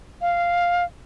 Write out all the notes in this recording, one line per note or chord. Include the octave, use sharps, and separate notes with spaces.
F5